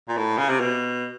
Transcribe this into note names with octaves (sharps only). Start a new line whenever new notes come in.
A#2
A2
C#3
C3
B2